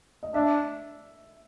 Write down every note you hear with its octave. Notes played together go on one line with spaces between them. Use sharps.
D#5
D4 E5